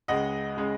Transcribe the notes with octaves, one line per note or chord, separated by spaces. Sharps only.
C#2 C#3 G#3 D#5 F#5
C#3 G#3